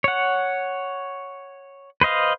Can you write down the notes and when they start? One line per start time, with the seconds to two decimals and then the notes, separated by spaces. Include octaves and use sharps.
0.04 C#5 F#5
2.01 B4 C5 D#5 F5